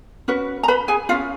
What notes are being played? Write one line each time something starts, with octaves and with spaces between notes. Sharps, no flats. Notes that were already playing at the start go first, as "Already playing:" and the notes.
C#4 F#4 B4
A#5
B4 B5
G#4 G#5
C#4 F4 F5